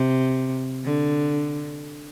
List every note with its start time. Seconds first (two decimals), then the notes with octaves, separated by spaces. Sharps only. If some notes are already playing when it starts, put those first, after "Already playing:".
Already playing: C3
0.84 D3